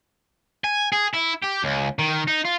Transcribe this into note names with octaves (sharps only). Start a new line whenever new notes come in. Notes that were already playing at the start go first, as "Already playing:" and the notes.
G#5
G#4
E4
G4
C#2
D#3
D#4
F4